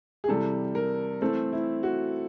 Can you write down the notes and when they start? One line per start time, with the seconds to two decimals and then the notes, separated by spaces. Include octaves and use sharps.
0.24 G#4
0.28 C3 E3 G3 A4
0.75 A#4
1.21 E3 A3 C4 A4
1.53 E4
1.83 F#4